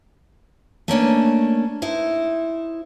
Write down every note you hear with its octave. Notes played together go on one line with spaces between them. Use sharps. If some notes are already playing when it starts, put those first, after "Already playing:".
A3 A#3 C#4 D4
D#4 E4 C5